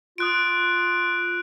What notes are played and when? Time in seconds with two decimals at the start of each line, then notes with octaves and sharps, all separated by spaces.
0.18 F4 D#6 F#6 D7